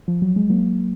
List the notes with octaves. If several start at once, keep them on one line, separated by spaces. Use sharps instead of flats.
F3
F#3
G#3
F#3 A#3